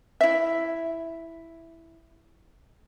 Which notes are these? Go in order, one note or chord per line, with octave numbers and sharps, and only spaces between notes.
E4 E5